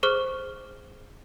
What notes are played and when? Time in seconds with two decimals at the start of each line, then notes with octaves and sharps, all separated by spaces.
0.03 G#4 C5 C#6 D6 F6